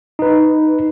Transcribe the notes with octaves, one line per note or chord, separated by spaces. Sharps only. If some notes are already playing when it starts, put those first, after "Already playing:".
D#4 B4